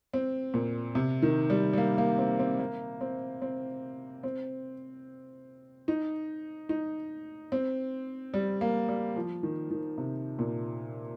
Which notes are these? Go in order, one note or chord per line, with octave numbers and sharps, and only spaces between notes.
C4
A#2
C3
D#3
G3
G3
A#3
A#3
C4
C4
A#3
C4
C4
C4
D#4
D#4
C4
G3
A#3
G3
F3
D#3
D#3
C3
A#2